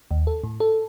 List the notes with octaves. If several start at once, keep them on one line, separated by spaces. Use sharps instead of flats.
D#2
A4
A2
A4